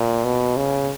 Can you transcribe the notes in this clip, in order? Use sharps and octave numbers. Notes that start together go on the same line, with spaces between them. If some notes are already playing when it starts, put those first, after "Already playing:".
Already playing: A#2
B2
C#3